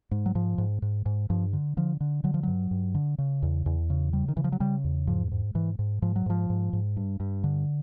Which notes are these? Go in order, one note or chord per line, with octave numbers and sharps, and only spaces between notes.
G#2
F#3
G#2 F3
G#2
G#2
G#2
G2 F3
D3
D3 F3
D3
D3 F#3
F3
G2 F#3
G2
D3
C#3
E2
E2
C#3
C#3 G3
D#3
C#3 E3
F3
F#3
C#3 G3
E2
G#2 F3
G#2
G#2 E3
G#2
G#2 F3
F#3
G#2 F3
G#2
G#2
G2
G2
D3